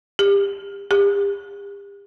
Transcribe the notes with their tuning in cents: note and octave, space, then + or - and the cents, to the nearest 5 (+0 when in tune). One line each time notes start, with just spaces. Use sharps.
G4 +30
G4 +40